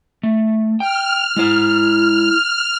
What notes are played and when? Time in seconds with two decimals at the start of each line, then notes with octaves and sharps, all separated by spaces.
0.23 A3
0.80 G5 F6
1.37 G#3 E4 C5